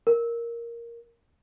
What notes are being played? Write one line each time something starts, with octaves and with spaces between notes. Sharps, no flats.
A#4